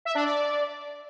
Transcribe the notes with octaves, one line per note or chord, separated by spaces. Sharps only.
E5
D4
D5